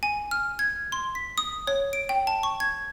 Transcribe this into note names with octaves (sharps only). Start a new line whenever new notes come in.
G#5
F6
G#6
C6
B6
D#6
C#5
D7
G5
A5
C#6
G#6